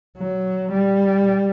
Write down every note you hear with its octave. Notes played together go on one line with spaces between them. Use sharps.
F#3
G3